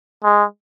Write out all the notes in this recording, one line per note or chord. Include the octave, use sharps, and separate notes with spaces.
G#3